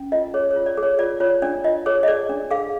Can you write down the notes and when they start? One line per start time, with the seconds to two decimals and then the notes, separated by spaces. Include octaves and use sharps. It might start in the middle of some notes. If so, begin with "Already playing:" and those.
Already playing: C#4
0.12 F4 D#5
0.34 G#4 C#5
0.51 C#5
0.56 F4
0.66 D5
0.77 G#4
0.83 C#5
0.99 F4 D5
1.20 F4 C#5
1.42 D4 D5
1.64 F4 D#5
1.86 G#4 C#5
2.03 D#5
2.07 G#4 D5
2.29 D4
2.50 G#4 F5